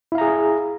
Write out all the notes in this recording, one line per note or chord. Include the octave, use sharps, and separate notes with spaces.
E4 G#4 F5 A#5